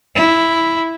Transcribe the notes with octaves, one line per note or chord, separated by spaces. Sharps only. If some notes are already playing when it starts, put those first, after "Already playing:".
E4